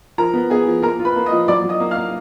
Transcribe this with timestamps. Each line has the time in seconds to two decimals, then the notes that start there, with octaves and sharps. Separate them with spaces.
0.18 F3 A#4 A#5
0.34 B3
0.50 B3 G#4 G#5
0.67 F3
0.82 A#3 A#4 A#5
0.99 F4
1.05 B4 B5
1.16 A#3
1.26 D#5 D#6
1.32 F3
1.48 F#3 D5 D6
1.64 F#3
1.69 D#5 D#6
1.80 A#3
1.91 F5 F6
1.97 A#3